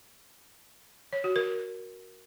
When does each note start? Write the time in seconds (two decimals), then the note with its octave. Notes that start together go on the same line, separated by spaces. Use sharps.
1.13 C#5
1.24 F#4
1.36 A#4